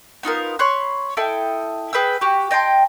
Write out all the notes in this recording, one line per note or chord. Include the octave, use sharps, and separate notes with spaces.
B3 D#4 F4 A#4
C#5 B5 C6 F#6
E4 A4 D#5 G5
G#4 B4 G5 E6
F#4 G4
D#5 G5 A5 C6